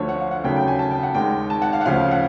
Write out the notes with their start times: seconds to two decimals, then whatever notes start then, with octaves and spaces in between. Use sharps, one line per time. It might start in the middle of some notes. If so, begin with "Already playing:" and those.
Already playing: D2 D3 F3 A3 C#5
0.09 F#5
0.20 F5
0.31 F#5
0.44 D#2 C#3 F#3 A3 G5
0.56 G5
0.67 G#5
0.79 A5
0.91 G5
1.03 F#5
1.14 D#2 D#3 G#3 G5
1.50 A5
1.62 F#5
1.73 F5
1.81 F#5
1.85 D2 C#3 F3 F5
2.11 F#5